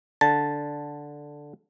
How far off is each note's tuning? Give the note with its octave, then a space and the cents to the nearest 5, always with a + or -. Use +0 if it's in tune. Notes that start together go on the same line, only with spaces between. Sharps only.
D3 +0 A5 +0